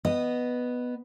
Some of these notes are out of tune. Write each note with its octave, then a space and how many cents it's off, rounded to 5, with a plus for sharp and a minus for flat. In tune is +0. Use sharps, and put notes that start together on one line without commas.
B3 +0 D#5 -15